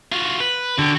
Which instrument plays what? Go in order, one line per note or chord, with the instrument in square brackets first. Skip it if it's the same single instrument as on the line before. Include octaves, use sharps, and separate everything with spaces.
[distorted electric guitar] F4 F#4
B4
[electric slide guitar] D3 [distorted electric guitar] F#4 G5